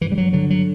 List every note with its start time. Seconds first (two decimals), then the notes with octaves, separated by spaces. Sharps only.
0.01 G2 E3
0.12 G3
0.18 F#3
0.33 D3 F#3
0.50 F#3